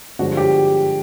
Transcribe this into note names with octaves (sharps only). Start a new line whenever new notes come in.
G2 D3 F3 G#3 F#4
G4